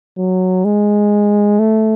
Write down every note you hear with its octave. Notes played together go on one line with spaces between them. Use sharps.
F#3
G#3
A3